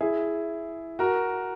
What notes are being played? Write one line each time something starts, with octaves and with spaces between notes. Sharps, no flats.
E4 G#4
F#4 A#4